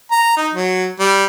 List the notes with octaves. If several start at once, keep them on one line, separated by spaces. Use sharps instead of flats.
A#5
D#4
F#3
G3